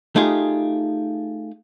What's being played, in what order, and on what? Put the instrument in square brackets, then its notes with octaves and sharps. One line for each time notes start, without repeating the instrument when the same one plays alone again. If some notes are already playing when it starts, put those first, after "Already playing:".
[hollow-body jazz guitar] A3 D#4 F4 G4 G#4